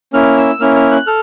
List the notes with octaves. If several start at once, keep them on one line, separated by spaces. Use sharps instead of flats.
A#3 C#4 E4 F6
E6
A#3 C#4 E4 F6
F6
F#6
A4 F6